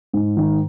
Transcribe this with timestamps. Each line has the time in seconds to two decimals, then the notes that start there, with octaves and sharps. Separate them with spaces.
0.13 G#2
0.37 D#3